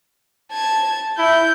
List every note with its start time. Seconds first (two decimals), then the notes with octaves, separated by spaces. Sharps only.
0.52 A5 G#6
1.18 E4 G6